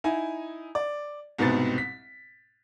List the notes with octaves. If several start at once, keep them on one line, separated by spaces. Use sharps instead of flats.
D#4 E4 G#5
D5
C2 G#2 B2 B3 C4 A6
B6